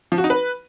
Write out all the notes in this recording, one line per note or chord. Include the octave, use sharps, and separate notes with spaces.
F3
F#4
D#4
B4